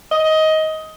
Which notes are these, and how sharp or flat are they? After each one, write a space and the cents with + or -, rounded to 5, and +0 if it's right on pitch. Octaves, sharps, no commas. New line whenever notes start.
D#5 +15